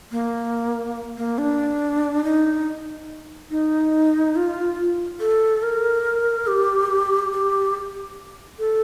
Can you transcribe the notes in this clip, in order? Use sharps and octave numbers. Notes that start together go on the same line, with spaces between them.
A#3
A#3
D4
D#4
D#4
F4
A4
A#4
G4
G4
A4